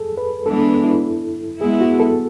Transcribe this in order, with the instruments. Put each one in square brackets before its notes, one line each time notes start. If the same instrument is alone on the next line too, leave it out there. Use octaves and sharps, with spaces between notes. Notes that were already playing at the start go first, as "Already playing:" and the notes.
Already playing: [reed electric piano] G#4 A4
B4
[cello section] E3 G#3 B3 D4 [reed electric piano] A4
[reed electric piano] E4
[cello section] G#3 B3 E4 [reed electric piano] G#4
[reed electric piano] F#4
A4